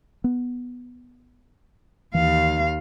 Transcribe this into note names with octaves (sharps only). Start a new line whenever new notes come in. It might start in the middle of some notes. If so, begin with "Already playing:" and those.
B3
D#2 E3 F5